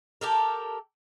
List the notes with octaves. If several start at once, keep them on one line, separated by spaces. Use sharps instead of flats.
G4 A4 A#4